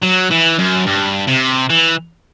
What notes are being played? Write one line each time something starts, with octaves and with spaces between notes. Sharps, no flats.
F#3
E3
F#2
G2
C3
E3